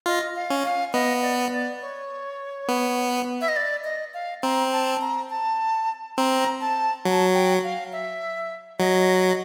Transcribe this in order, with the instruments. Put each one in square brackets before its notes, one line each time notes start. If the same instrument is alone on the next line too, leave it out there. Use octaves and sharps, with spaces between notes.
[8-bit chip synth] F4 [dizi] D#5
[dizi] F5
[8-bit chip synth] C#4
[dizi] F5
[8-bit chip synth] B3 [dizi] D#5
[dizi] D5
D5
C#5
[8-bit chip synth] B3
[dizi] E5
D#5
D5
D#5
F5
[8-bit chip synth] C4 [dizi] A#5
[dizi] A5
A#5
A5
[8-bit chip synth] C4 [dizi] A#5
[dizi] A5
[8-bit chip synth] F#3 [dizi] A5
[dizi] G5
F5
E5
[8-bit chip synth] F#3 [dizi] D#5